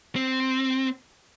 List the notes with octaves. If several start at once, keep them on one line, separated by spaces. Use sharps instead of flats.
C4